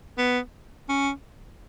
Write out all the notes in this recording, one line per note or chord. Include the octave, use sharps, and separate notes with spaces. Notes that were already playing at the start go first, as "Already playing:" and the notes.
B3
C#4